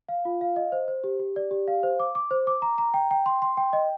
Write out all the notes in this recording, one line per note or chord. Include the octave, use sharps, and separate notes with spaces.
F5
F4
F5
D#5
C5
C5
G4
G4
D5
G4
F5
C5
D6
D6
C5
D6
A#5
A#5
G5
G5
C6
C6
G5
D#5